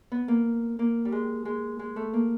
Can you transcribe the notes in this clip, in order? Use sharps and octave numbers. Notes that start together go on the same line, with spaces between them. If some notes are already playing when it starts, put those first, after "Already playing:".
B3
A#3
A#3
G3
G#3
G#3
G#3
A3
A#3